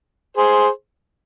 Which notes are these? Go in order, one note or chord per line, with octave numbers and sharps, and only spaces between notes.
G#4 C5